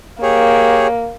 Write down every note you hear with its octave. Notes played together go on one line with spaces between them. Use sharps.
A#3 G4 G#4 C#5